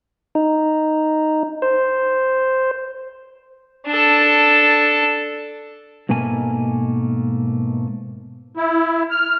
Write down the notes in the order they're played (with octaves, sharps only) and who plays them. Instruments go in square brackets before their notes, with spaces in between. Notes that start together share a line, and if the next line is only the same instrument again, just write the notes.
[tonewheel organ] D#4
C5
[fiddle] D4 A4
[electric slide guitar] G#2 B2 A3 A#3 G#5
[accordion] E4
F6